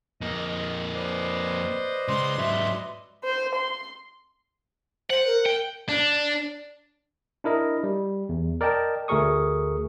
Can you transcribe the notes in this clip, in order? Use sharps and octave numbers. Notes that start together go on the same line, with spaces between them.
F2 A#3 D#5
B4 C5 D5 D#5
C#3 G#3 C6
G#2 F#3 E5
C5
C6
C5 F#5
A#4
G5
D4
D4 E4 A#4 D#5
G3
E2
A#4 D5 D#5 G5 A5
D2 A3 G#4 A#4 C#6 D#6